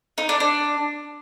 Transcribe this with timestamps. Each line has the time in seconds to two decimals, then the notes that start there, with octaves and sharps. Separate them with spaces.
0.18 D#4
0.29 D4
0.40 D4